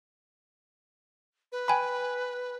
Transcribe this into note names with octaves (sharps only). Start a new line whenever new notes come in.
B4
G5 G#5 B5